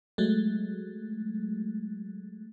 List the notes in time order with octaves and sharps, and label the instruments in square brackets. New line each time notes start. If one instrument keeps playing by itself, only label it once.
[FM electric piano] F#3 G#3 A3